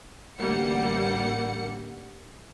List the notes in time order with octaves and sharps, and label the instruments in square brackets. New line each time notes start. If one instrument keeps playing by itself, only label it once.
[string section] A1 D2 G3 A#3 F#5 C#7